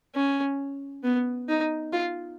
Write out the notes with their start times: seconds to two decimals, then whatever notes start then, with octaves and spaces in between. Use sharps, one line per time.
0.15 C#4
1.04 B3
1.49 D#4
1.93 F4